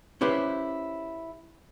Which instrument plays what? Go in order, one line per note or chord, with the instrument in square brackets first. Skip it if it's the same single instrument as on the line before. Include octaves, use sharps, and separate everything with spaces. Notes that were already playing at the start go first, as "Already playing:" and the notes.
[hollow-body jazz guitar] C#4 E4 G4 B4 C5